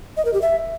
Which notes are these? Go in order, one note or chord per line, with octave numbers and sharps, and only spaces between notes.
D#5
A#4
G4
E5